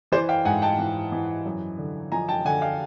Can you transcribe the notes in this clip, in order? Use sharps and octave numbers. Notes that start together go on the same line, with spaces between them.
E3 C5 D5
F5 G5
G#2 F#5 G#5
G5 A5
E3
E3
F#2
D3
F3 G#5 A#5
G5 A5
D3 F#5 G#5
F5 G5